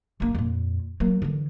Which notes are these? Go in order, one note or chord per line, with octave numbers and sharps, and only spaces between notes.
F#2 A#3
F2 A#2
F#3 A#3
D3 E3